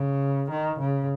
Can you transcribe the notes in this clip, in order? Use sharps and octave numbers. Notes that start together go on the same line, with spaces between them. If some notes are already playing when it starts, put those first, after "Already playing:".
Already playing: C#3
D#3
C#3